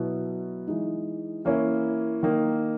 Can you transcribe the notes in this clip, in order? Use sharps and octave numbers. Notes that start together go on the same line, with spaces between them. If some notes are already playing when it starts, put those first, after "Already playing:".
Already playing: B2 F#3 B3 E4
E3 G#3 D#4
E3 A#3 C#4 E4
D#3 A#3 D#4